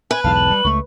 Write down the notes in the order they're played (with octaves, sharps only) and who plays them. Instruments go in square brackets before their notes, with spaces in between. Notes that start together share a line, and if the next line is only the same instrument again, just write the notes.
[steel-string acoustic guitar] B4 [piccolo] G#5
[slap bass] B1 E2 G#2 [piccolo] F5 [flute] A5
[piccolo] F#7
[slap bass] G3
[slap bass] C#2 A3 [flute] C#6